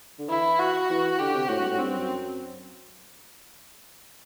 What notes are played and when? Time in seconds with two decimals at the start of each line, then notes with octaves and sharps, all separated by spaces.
0.18 D3
0.29 E3 E4
0.59 F#4
0.89 E3
1.19 D3 G4
1.34 C3
1.49 A2 F#4
1.59 G2
1.69 A2
1.78 G2 C4
1.94 F#2